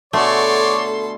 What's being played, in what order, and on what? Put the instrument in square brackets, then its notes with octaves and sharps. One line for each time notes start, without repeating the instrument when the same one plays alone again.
[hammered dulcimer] B2 D3 G#4 [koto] A3 [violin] A4 C6 [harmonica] C#5 D5